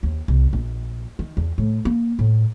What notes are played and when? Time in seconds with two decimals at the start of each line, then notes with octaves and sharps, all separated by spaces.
0.03 D#2
0.28 C2
0.53 A#1
1.19 D#3
1.37 E2
1.58 A2
1.85 A#3
2.19 A2